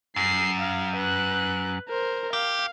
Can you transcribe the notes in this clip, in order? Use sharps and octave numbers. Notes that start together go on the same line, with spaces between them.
F#2 C7
F5
B4 F#6
A#4 C5
G4 F5